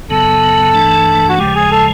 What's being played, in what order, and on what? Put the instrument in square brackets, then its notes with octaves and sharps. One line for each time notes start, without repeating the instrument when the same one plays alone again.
[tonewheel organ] F#2 C#3 F#3 B3 [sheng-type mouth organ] A4
[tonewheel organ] G2 E3 A3 D4
[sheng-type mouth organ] F#4
[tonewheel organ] D#2 C#3 F3 G#3 [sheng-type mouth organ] G4
[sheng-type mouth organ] G#4
A4